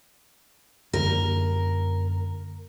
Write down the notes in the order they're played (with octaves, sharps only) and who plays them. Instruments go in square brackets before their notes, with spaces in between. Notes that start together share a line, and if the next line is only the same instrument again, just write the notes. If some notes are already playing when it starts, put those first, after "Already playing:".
[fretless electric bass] F#2 D3 A#3 [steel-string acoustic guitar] A#4